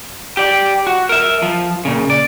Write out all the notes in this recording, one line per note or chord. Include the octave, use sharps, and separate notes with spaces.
G4 D5
F#4
A#4 E5
F3
A#2 C#3
D5